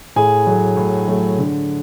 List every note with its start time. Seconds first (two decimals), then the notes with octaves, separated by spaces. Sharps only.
0.16 A2 G#4 G#5
0.47 F#3 A3
0.77 A2
1.08 F#3 A3
1.39 D3